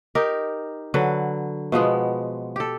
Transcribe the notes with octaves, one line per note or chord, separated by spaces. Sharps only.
D#4 G4 A#4
D3 F#3 B4
B2 F3 G#3 B3
G4 A4